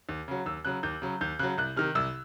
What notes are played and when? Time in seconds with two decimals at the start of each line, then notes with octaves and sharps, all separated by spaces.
0.09 D#2
0.28 C#3 F#3
0.46 D#2 E6
0.65 C#3 F#3 F#6
0.83 D#2 G6
1.02 C#3 F#3
1.21 D#2 G6
1.39 C#3 F#3 F#6
1.58 C2 F#6
1.76 C3 D#3 F6
1.95 C2 E6